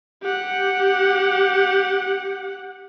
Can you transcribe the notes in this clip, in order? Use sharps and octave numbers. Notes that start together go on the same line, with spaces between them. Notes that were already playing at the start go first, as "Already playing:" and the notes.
G4 F#5